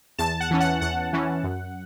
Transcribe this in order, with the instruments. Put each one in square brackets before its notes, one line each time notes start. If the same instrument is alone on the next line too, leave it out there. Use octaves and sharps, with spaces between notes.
[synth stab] E2 A5
F#5
E3 C#4
F#5
E2 F#5
E3 C#4
F#2